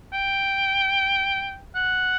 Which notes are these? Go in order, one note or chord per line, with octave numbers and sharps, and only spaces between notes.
G5
F#5